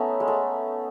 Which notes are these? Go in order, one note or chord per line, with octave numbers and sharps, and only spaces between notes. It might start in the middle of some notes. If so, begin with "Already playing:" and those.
Already playing: A3 B3 C#4 D#4
G#3
A3